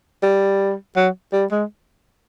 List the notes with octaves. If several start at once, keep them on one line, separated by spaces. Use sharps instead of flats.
G3
F#3
G3
G#3